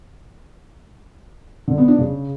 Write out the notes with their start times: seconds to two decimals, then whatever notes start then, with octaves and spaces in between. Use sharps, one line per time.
1.68 D3
1.78 B3
1.88 D4
1.98 C#3